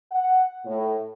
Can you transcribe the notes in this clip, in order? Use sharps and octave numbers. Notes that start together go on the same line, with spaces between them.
F#5
A2